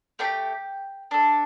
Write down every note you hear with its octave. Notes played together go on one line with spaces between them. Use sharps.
A3 D4 G4 G5
D4 A4